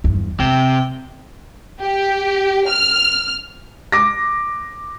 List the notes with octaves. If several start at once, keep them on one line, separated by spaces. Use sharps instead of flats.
E2 G2
C3 B3 G5
G4
F6
D6 A#6